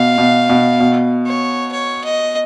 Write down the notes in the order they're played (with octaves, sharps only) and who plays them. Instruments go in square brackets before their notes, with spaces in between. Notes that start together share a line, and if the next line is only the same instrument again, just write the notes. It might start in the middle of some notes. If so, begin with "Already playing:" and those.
Already playing: [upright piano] B2 [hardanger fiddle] F5
[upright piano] B2
B2
B2
[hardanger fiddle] C#5
C#5
D#5